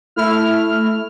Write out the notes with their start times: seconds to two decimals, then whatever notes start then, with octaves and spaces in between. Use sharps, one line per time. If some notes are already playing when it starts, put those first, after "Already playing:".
0.16 A3 E4 F6